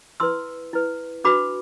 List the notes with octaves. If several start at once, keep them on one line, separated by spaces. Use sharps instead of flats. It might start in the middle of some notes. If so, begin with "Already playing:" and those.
E4 B4 C6 E6
E4 B4
D4 F#4 B4 B5 D6